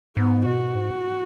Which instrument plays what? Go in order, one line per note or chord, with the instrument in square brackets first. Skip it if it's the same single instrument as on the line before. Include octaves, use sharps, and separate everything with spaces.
[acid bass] G#2 [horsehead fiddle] B3
[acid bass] B2 [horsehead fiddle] F#4
[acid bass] G#2